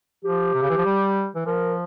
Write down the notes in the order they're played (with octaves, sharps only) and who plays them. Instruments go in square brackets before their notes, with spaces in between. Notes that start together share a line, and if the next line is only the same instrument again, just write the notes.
[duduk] F3 [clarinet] G4
[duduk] C3
C#3
E3
F3
G3
E3
[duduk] F3 [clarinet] A#4